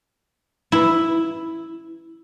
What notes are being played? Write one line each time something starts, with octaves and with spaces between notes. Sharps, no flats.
E4